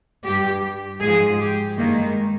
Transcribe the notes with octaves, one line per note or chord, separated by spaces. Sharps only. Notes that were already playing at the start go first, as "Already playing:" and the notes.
G2 G3 G4
G#2 F3 G#3 G#4
G4
G2 D#3 G#3 A#3